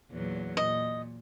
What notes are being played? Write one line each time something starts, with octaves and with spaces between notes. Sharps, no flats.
E2 A#2 F#3
A#2 D#5